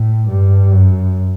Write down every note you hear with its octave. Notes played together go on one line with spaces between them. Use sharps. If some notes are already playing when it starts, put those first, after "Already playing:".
Already playing: A2
G2
F#2